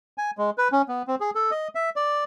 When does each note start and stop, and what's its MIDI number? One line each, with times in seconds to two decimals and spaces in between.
0.18 0.31 80
0.38 0.50 56
0.58 0.68 71
0.72 0.82 61
0.88 1.02 59
1.07 1.15 60
1.20 1.30 68
1.35 1.51 69
1.51 1.68 75
1.75 1.90 76
1.96 2.24 74